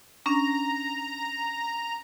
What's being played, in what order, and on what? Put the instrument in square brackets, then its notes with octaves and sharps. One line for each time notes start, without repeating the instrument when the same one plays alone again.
[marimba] C#4 D4 [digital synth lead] A#5